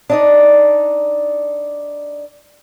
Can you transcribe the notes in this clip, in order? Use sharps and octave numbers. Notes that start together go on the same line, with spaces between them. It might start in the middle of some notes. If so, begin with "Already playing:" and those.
D4 D#4 D5